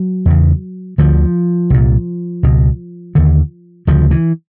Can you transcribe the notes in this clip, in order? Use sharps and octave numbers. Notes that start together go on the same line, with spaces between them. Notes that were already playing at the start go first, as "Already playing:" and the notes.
Already playing: F#3
E2 C#3
D2 D3 F3
C2 A#2
C#2 B2
D#2 D3
D2 C#3 F3
E3